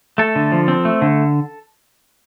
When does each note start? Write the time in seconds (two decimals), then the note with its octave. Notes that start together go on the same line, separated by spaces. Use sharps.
0.18 A3 A4
0.36 D3
0.52 F3
0.68 C4
0.85 A3
1.02 D3